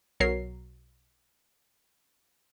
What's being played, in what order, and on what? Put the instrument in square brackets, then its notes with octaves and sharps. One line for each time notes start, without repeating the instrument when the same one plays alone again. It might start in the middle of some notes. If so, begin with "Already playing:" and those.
[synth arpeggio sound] B1 F#3 A#4 C#5 C7